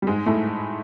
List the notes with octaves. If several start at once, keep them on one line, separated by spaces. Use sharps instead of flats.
G3
G#2 G#3
A2 A3